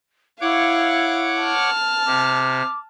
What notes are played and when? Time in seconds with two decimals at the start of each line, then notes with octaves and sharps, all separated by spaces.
0.41 E4 C#5 F5 F#5 D6
1.41 A5 F6
2.06 C3 D6